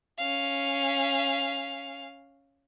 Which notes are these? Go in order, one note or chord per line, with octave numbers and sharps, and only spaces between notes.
C#4 F5